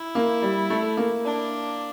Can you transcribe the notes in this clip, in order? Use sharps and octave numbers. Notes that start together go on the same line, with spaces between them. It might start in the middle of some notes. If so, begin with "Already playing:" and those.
Already playing: E4
A#3
G3
A3
A#3
D4